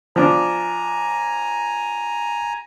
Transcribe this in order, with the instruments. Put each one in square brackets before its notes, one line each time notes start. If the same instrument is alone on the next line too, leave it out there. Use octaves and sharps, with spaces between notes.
[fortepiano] F3 D4 [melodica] G#5 A#5